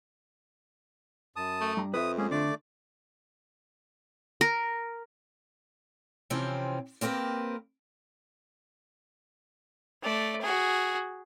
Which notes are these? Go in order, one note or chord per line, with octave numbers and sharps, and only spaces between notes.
F#2 A5 D#6
A3
G2 A#5
F2 B4 E5 D#6
G#3 A#3 C#4 G#4
D3 A3 D5 D6
A#4
C3 E3 F3 C4 C#4
A#3 C4 G4 A#4 B4
A3 D5
F#4 G#4